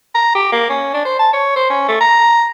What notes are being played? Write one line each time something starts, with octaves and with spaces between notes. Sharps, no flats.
A#5
G4
A#3
C#4
D4
C5
A5
C#5
C5
C#4
A3
A#5